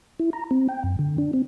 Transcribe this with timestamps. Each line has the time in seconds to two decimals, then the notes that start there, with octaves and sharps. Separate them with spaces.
0.20 E4
0.33 A#5
0.51 C4
0.69 G5
0.84 F#2
0.99 D3
1.18 D4
1.33 C4